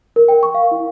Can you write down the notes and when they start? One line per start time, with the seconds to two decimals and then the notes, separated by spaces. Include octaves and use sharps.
0.16 A#4
0.28 G5
0.43 C#6
0.55 F5
0.71 E4